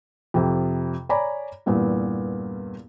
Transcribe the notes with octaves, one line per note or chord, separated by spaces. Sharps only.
F2 C3
C#5 D5 G#5 A#5 B5 D6
E2 G2 A#2 B3